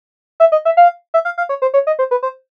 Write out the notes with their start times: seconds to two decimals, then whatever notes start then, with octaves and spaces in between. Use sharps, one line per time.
0.40 E5
0.52 D#5
0.65 E5
0.77 F5
1.14 E5
1.25 F5
1.38 F5
1.49 C#5
1.62 C5
1.74 C#5
1.87 D#5
1.99 C5
2.11 B4
2.23 C5